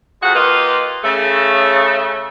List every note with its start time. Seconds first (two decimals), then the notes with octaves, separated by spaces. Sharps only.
0.22 F2 G#3 F#4 F#5
0.36 A#3 F4 G4 B4 D#5
1.04 C#3 A3